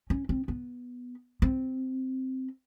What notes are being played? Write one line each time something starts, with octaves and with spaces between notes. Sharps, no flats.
C#4
C4
B3
C4